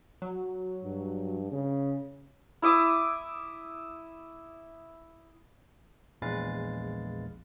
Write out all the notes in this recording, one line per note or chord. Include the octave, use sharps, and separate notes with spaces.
F#3
G2
C#3
E4 E5 D6 D#6
A#1 E2 G#3 B4 F5 A6